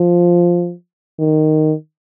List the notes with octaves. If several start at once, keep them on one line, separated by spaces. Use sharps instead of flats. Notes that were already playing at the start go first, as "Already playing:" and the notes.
Already playing: F3
D#3